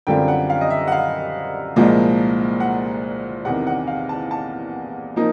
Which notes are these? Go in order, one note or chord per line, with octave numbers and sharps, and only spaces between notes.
F#2 D3 G3 C4 F4 G5
F#5
F5
D#5
E5
F#5
F5
C2 A#2 F3 G#3
F#5
E2 C3 D#3 F#5
F#5
F5
A5
A5
F3 A#3 D#4